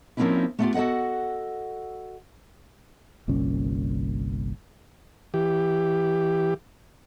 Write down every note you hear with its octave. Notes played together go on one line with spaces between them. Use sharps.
F3 A#3 C4 C#4 D#4 E4
A3 B3 C#4 D#4 F4 G4
F#4 A4 C5 D#5 F#5
G1 C2 A#2 C#4
E3 G4